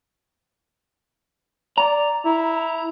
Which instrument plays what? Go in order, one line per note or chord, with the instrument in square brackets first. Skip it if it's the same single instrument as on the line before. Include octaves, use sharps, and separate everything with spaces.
[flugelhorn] D5 [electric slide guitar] A#5
[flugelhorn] E4